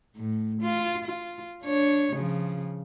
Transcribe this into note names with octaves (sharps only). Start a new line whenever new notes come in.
A2
F4
F4
D4 C#5
C#3 F3